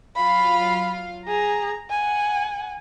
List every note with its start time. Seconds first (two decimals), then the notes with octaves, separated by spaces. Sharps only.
0.16 F#3 F4 F5 B5
1.28 G#4 A#5
1.90 F#5 G#5